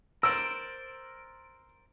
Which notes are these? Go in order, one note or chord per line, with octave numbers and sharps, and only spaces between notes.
A#4 C5 D5 E6